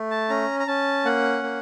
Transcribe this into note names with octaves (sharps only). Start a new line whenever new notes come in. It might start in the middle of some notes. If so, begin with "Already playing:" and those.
Already playing: A3
A5
C#4 A#5
A#5
C#4 A5
A#3 F#5
A#3